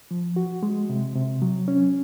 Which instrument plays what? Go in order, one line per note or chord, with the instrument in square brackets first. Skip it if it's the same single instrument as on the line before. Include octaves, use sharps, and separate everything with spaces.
[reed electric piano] F3
F#4
G#3
C3
C3
F#3
C#4